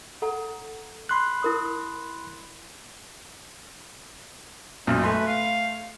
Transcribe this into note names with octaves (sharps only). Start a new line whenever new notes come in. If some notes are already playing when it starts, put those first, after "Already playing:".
A4 F#5 A#5
B5 C6 F#6
E4 A#4 D#6
B1 F#2 A#2 D#4
A3 B4 G#5 C6
F5